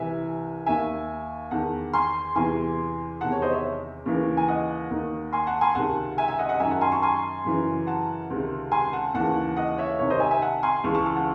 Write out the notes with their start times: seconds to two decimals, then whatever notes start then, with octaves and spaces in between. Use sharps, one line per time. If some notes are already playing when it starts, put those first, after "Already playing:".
Already playing: C2 C3 E3 E5 G#5
0.66 D#2 D#3 E5 G#5
1.51 E2 D#3 F#5 A5
1.94 G#5 C6
2.35 E2 C3 E3 G#5 C6
3.21 E2 C3 D#3 F#5 A5
3.32 C#5
3.42 C5 D#5
3.53 C#5 E5
4.06 D#2 C#3 E3
4.37 G#5
4.48 D#5 F#5
4.90 D#2 D#3
5.33 G#5 C6
5.47 F#5 A5
5.61 G#5 C6
5.75 C#2 C3 D#3 F#5 A5
6.18 E5 G#5
6.28 E5 G#5
6.39 D#5 F#5
6.49 D#5 F#5
6.60 F#2 D#3 E5 G#5
6.71 F#5 A5
6.81 G#5 C6
6.92 A5 C#6
7.02 G#5 C6
7.45 F#2 C#3 E3
7.87 F#5 A5
8.30 C#2 C3 D#3
8.72 G#5 C6
8.93 F#5 A5
9.14 D#2 C#3 E3 F#5 A5
9.56 D#5 F#5
9.78 C#5 E5
9.99 C2 C3 D#3 C#5
10.10 C5 D#5
10.20 E5 G#5
10.31 E5 G#5
10.42 F#5 A5
10.63 G#5 C6
10.84 C#2 C#3 E3 A5 C#6
10.95 A5 C#6
11.06 A5 C#6
11.16 F#5 A5